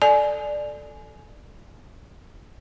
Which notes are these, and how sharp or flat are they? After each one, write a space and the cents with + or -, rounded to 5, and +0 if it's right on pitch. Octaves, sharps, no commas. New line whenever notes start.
A4 +0 D5 +10 G#5 +20